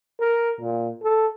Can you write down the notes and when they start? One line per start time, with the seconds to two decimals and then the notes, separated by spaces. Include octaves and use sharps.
0.19 A#4
0.61 A#2
1.03 A4